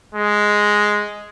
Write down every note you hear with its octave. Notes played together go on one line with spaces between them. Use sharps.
G#3